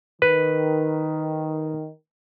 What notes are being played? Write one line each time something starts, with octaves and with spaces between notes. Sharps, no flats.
D#3 B4